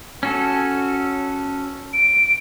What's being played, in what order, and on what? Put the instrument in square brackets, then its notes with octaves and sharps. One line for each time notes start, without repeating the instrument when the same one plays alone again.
[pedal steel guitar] C#4 F#4 A4
[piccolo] D7